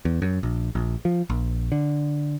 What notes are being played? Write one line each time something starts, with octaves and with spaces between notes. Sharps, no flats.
E2
F#2
A#1
A#1
F3
A#1
D3